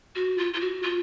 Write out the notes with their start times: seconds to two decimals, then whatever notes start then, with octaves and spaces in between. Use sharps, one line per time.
0.15 F#4
0.38 F4
0.53 F4
0.61 F#4
0.82 F4